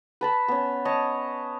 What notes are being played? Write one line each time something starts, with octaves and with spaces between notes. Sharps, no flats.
B4 A5 B5
B3 C#4
C#5 D#5 A5